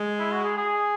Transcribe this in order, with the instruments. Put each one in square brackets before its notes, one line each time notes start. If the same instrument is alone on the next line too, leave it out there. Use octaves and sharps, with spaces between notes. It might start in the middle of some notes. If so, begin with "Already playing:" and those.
Already playing: [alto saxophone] G#3
[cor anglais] E4
F#4
G#4
G#4